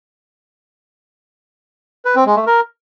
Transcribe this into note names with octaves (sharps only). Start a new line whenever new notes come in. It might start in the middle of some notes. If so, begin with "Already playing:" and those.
B4
C4
G#3
A3
A#4